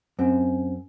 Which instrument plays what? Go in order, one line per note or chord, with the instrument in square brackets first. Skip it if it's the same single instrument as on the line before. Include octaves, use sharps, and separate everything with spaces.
[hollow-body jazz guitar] F#2 C4